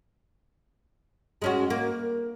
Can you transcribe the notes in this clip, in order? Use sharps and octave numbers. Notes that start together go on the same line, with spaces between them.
G#3 C#4 F#4
A#3